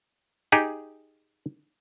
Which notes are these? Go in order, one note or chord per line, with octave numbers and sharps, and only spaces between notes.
D#4 G4 G#4